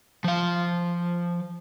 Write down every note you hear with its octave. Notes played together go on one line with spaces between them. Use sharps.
F3 F5